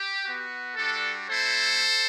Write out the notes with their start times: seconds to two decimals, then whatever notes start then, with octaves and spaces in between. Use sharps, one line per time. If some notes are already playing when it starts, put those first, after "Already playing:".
Already playing: G4
0.22 B3 F#4
0.75 G3 D4 F#4 A4
1.28 A3 C4 E4 A4 C5